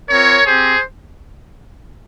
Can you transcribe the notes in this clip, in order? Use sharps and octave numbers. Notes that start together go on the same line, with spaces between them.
C4 F4 A#4 C#5
C4 G4 G#4 C5